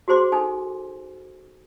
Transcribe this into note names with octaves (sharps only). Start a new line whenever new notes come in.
F#4 G#4 C5 C6 D6
D#4 A4 G#5